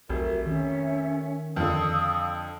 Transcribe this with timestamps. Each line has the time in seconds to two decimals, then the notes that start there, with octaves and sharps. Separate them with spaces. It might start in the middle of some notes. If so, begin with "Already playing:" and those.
0.09 F1 B1 F#4 A#4 E5
0.46 D#3 C#4 E5
1.56 F2 D3 F5 D#6 E6